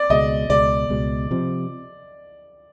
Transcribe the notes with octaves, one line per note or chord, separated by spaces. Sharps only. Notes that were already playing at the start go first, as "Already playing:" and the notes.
Already playing: D5
C#2 B2 G#3 D#5
C#2 B2 G#3 D5
C#2 B2 G#3
C3 F3